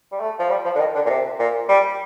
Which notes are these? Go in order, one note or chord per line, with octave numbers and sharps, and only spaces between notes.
G3
A3
F3
G3
F3
D3
D#3
D3
A#2
C3
A#2
G3